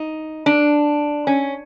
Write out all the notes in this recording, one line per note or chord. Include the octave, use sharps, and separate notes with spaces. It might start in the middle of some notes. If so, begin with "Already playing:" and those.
Already playing: D#4
D4
C#4